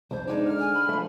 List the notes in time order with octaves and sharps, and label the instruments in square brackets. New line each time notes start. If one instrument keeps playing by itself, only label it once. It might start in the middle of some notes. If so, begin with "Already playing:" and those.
[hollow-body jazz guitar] C2 F2 [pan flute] C5
[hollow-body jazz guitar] G#3 D4 [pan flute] D#4
[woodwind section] D3 F6
[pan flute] G#5
B5
[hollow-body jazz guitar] F3 A3